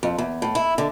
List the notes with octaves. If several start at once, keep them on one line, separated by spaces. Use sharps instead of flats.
F2
E2
A2
E4
D3